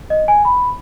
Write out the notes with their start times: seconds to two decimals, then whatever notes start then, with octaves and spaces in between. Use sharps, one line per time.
0.10 D#5
0.28 G#5
0.45 B5